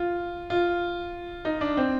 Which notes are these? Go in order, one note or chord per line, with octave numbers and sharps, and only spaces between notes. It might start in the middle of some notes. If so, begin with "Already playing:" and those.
Already playing: F4
F4
D#4
D4
C4